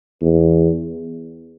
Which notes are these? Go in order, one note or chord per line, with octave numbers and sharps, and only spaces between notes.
E2